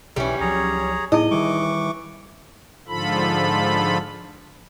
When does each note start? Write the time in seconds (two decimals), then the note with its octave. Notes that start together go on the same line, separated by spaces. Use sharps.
0.16 B1 B2 E3 G3 C#4
0.40 C#2 F3 F#3 G#4 C#5 A#5
1.12 A2 B3 D#4 E4 G#4 D#5
1.31 D#3 E3 G3 C#6 D6
2.88 G#2 D3 F3 F4 A4 B5